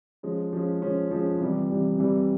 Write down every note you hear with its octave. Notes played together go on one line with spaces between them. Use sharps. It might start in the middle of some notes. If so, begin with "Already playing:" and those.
F3 G#3 C#4
F3 G#3 C#4
F3 G#3 C#4
F3 G#3 C#4
C3 E3 G3
C3 E3 G3
C3 E3 G3